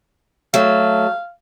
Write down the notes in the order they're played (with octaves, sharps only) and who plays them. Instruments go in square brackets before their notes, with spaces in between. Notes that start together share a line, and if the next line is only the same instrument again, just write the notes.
[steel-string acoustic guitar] F#3 A3 [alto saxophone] F5